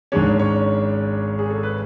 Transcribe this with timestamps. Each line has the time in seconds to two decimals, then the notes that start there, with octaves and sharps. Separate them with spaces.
0.12 G#1 G#2 G#3 C#4 D4 C#5
0.39 C#4 C#5
1.39 G#4
1.50 A4
1.63 B4